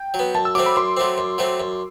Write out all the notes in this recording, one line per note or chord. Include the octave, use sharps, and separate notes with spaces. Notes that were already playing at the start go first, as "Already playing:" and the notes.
Already playing: G5
F#3
B3
F#2 A5
E6
F#3 A3 C4 D6
B5
F#2 C6
F#3 A3 C4
F#2
F#3 A3 C4
F#2